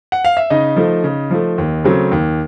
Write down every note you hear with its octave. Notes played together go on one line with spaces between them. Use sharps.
F#5
F5
E5
C#3 D#4 D#5
F3 A3
C#3
F3 A3
D#2
C#3 F#3 A3 C4
D#2